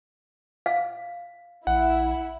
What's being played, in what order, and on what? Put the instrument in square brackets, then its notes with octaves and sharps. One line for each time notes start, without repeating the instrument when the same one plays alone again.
[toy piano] F5
[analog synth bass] A#1 [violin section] E4 [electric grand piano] F#5